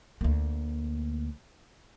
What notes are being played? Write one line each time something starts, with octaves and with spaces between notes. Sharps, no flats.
D2 A#3